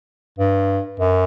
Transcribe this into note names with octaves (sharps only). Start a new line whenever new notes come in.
G2
F#2